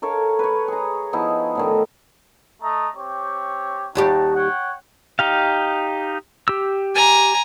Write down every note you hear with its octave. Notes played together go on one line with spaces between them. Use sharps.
A4 A#4 C#5 F5
B4 C#5
G#4 A#5
F3 B3 D#4 E4
A2 D3 D#3
A3 D#5 A#5
C4 G4 C#5
D#2 G3 D#4 F#4 G4 A5
C#5 F#5 G5
D#4 G4 F5
G4 E6
G#5 A#5